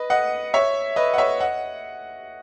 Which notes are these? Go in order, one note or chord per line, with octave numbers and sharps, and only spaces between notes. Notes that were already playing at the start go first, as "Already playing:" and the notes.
Already playing: B4 D#5
D#5 F#5
C#5 E5
B4 D#5
F#5
C#5 E5
D#5 F#5